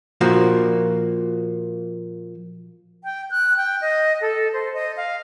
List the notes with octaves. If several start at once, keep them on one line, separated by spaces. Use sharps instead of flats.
A#2 F3 A#3 F#4
G5
F#6
G5
D#5
A4
C5
D#5
F5